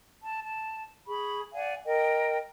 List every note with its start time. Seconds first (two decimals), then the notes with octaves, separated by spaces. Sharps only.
0.23 A5
0.43 A5
1.07 G#4 B5 C#6
1.53 D5 F5 F#5 G#5
1.86 A#4 D#5 G5